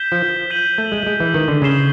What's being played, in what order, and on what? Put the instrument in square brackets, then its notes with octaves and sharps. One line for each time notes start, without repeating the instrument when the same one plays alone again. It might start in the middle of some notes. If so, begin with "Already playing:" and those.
Already playing: [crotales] G6 B6 E7 G7
[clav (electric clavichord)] F3
[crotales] G6 B6 D#7 F#7
[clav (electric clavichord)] A3
G#3
G#3
E3
D#3
D3
[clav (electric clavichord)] C#3 [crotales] G#6 C7 E7 G7